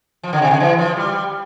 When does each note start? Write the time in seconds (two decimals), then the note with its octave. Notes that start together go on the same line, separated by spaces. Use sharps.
0.23 F3
0.33 D3
0.42 C3
0.51 D3
0.60 E3
0.79 F3
0.97 G3